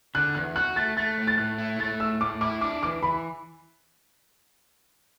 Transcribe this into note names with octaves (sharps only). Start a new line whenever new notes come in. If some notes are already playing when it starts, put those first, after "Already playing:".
D3 F#6
E2 F#6
F#4 F#6
A3 A6
A3 A6
A2
A6
A2 F#6
E4
A3 A6
A2 E6
A2 D6
E4 D6
D4 D6
E3 D6
E3 B5